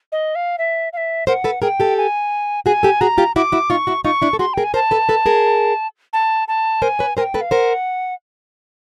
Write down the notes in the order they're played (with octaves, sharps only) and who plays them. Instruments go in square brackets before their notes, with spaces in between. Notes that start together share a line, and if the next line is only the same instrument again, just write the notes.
[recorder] D#5
F5
E5
F5
E5
[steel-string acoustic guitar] A#4 C5 [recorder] F#5
[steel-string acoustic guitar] A4 B4
[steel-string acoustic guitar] G#4 A#4 [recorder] G5
[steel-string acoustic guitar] G4 A4
[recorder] G#5
[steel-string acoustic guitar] F#4 G#4 [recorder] G#5
[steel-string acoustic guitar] G4 A4
[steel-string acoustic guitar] F#4 G#4 [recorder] A#5
[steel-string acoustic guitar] F4 G4
[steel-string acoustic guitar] E4 F#4 [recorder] D6
[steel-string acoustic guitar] E4 F#4
[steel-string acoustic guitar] D#4 F4 [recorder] C#6
[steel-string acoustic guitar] E4 F#4
[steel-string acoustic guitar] D#4 F4 [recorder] C#6
[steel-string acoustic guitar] D4 E4
A4
[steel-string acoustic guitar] F#4 G#4 [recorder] C6
[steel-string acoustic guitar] G#4 A#4 [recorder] G5
[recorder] G#5
[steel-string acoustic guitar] A#4 C5 [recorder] A5
[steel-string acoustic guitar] A4 B4
A4 B4
G#4 A#4
[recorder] A5
A5
[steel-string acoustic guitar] A#4 C5 [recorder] G#5
[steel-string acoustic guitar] B4 C#5
[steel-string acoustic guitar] A#4 C5 [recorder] G#5
[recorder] G5
[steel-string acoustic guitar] A4 B4
[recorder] F5
[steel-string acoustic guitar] A#4 C5 [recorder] F#5